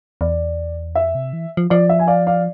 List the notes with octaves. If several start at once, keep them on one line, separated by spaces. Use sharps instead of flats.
E2 D5
F2 E5
C3
E3
F3
F3 D5
E5
G#5
D5 F5
D5 F5